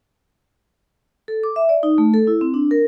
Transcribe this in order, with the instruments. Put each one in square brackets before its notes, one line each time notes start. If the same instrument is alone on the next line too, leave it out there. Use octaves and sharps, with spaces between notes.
[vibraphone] A4
D6
E5
D5
D#4
A3
A4
E4
C4
D4
A#4